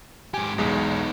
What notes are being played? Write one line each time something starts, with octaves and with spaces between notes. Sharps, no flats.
G#2 G4 G#5
B1 E2 G#3 B3 D#4